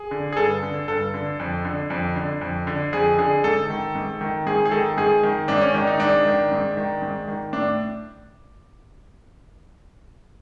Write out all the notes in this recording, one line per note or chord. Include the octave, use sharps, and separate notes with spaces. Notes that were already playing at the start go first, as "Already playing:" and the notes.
Already playing: G#4
D3
G#4
G2 A4
D3
G2 A4
D3
F2
D3
F2
D3
F2
D3
F2 G#4
D3 G#4
G#2 A4
D#3
G#2
D#3
G#2 G#4
G#4
D#3 A4
G#2 G#4
D#3
G#2 D4
C#4
D#3 D4
D#4
G#2 D4
D#3
G#2
D#3
G#2
D#3
A2 D4